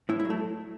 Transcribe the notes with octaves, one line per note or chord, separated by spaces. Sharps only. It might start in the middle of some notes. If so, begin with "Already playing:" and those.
A2 E4
E4
F#3
A3